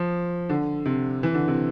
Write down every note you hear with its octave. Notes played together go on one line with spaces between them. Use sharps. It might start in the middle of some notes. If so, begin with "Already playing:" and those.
Already playing: F3
D3
C3
E3
D3
C3